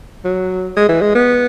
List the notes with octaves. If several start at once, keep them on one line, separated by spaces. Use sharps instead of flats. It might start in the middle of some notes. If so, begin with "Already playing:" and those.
F#3
G#3
E3
G#3
B3